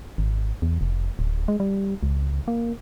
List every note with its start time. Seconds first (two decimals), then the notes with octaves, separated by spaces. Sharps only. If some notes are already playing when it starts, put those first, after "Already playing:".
0.18 G#1
0.62 E2
0.81 F1
1.19 D1
1.48 G#3
1.60 G3
2.03 C#2
2.48 A#3